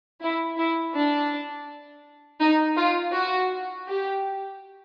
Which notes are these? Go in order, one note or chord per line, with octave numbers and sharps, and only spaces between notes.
E4
E4
D4
D#4
F4
F#4
G4